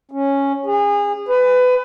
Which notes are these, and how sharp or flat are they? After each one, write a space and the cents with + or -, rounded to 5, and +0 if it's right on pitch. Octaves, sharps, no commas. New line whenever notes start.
C#4 -5
G#4 -30
B4 +25